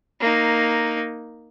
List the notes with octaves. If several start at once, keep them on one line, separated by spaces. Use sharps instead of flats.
A#3 D#4